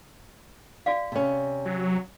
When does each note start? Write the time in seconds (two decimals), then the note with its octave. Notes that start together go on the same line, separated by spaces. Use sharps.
0.86 F#4 D5 F5
1.12 C3 C#4
1.66 F#3